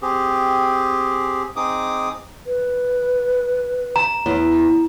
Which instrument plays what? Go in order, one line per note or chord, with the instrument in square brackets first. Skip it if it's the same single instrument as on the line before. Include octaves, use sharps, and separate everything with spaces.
[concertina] C4 G4 G#4
C4 D#4 G#4 D6 D#6
[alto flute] B4
[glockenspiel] A#5
[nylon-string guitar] E2